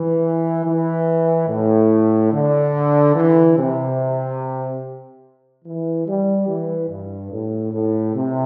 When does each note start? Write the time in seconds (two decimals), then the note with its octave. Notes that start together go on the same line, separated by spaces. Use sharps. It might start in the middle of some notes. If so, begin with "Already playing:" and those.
Already playing: E3
0.65 E3
1.48 A2
2.32 D3
3.15 E3
3.57 C3
5.65 E3
6.06 G3
6.48 E3
6.89 G2
7.32 A2
7.73 A2
8.15 C3